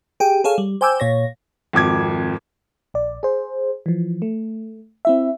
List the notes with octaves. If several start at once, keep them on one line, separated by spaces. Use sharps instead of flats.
G4 G#4 G5
G#4 A4 C#5 F5
G3
C5 G5 G#5 D6 E6 G6
A#2 C#5 A#6
G#1 F2 D6 G#6
A#1 D5
G#4 C5
E3 F3
A3
C4 E4 E5